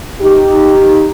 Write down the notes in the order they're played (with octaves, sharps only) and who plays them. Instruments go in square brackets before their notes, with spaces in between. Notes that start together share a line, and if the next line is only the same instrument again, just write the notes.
[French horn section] D#4 G4